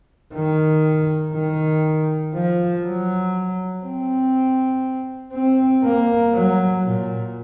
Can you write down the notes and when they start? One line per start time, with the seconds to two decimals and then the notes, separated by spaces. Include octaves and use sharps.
0.34 D#3
1.34 D#3
2.34 F3
2.85 F#3
3.85 C4
5.34 C4
5.84 A#3
6.34 F#3
6.84 A#2